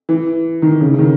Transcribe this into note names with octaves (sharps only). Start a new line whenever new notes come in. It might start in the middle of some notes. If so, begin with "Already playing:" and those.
E3
D#3
C#3
C#3
D#3